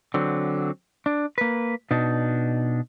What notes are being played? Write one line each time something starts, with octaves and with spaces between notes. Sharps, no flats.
D3 F#3 C4
D4
A#3 B4
B2 D4 D#4